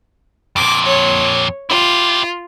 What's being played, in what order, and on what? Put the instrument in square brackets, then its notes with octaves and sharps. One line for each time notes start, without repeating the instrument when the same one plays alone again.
[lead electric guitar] F2 A#2 [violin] D6
[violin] C#5
[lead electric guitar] E4 G4 [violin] F4